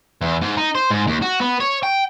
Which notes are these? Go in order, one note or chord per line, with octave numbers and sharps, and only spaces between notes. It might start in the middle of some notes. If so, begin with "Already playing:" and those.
E2
G#2
D#4
C5
G#2
D#2
F#4
B3
C#5
G5